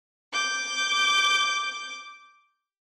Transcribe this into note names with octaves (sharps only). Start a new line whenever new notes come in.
D6 G6